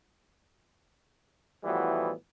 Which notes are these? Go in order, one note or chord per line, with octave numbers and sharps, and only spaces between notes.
A2 E3 F3 G3 B3 F#4